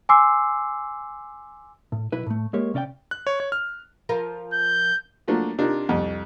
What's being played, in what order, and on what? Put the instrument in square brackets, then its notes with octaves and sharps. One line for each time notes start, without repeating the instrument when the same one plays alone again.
[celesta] G#5 C6 D6 E6 C7
[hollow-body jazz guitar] A2
B1 E4 B4
A2 A3
G#3 A#3 G4 C#5
C3 C#4 D5 D#5 G5
[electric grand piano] F#6
C#5
C#5
F6
[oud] F3 F4 A#4
[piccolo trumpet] G6
[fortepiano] F3 F#3 A3 A#3 D4
C3 D4 D#4 F4 A#4
C2 F2